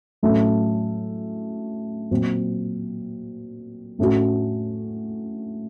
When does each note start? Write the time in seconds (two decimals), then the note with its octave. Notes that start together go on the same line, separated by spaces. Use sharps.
0.23 A2 F#3 A3 C#4
2.11 A#2 F#3 C4
3.99 A2 A3 C#4 F#4